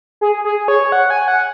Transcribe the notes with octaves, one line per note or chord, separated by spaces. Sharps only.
G#4
G#4
C#5
F#5
G#5
F#5